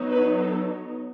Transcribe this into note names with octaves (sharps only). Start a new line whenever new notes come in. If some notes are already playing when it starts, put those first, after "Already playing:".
Already playing: F#3 B3 D#4
B4
A4